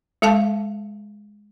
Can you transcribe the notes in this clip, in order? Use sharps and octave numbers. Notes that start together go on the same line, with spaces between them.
G#3 A4 F5 A5